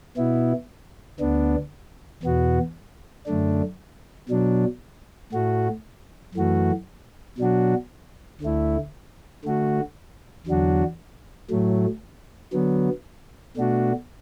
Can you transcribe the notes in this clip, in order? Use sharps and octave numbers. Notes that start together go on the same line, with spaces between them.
B2 B3 E4
D2 D3 B3 D4
E2 B2 B3 F#4
F#2 D3 A3 D4
B2 F#3 D4
A2 A3 F#4
F#2 E3 A3 F#4
B2 F#3 D4 F#4
D2 D3 A3 E4
D3 A3 F#4
E2 D3 F#3 D4 F#4
A2 F#3 A3
D3 F#3 B3
B2 A3 D4 F#4